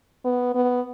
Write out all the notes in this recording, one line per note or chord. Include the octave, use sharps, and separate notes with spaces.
B3
B3